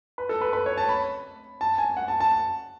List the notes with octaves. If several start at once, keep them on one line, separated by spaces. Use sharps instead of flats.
B4
A4
B4
B4
C#5
A5
B5
A5
G#5
F#5
A5
A5